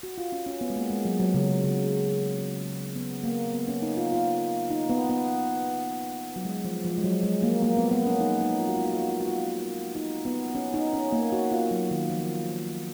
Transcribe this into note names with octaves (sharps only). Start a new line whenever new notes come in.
F#4
F4
C#4
C#4
B3
G#3
A#3
G#3
F#3
F#3
C#3
C#3
C#3
B3
A#3
B3
C#4
D#4
F4
F4
D#4
B3
B3
F#3
G#3
F3
F3
G#3
F#3
G#3
A#3
A#3
B3
B3
C#4
D#4
D#4
F4
F#4
F4
F#4
F4
F#4
F4
F#4
F4
D#4
B3
C#4
D#4
C#4
A#3
F#4
F4
F#3
D#3
F3